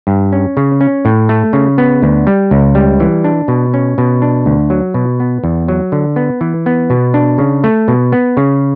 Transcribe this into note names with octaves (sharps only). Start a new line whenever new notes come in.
G2
C#4
C#3
C#4
A2
A3
C#3
B3
D2
G3
C#2
G3
E3
D4
B2
C#4
B2
D4
D2
F#3
B2
B3
E2
F#3
D3
B3
E3
B3
B2
D4
C#3
A3
B2
B3
C#3